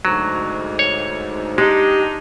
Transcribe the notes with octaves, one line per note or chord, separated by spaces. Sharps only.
D2 G#2 F#3
C#5
G#3 D4 D#4 G4